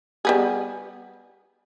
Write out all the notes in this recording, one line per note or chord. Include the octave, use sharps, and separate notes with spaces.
G3 B3 G#4